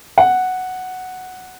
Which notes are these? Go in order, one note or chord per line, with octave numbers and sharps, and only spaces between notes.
F#5